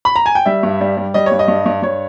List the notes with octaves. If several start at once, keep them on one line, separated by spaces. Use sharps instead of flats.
B5
A#5
G#5
G5
G3 E5
G2
G3
G3
G3 D#5
C#5
G2
D#5
G2
G2
G2 C#5